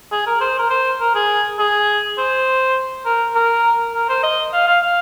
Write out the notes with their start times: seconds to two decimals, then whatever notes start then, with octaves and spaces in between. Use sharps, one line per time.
0.12 G#4
0.27 A#4
0.41 C5
0.59 A#4
0.70 C5
1.00 A#4
1.15 G#4
1.59 G#4
2.18 C5
3.05 A#4
3.35 A#4
3.95 A#4
4.09 C5
4.23 D#5
4.53 F5
4.67 F5
4.83 F5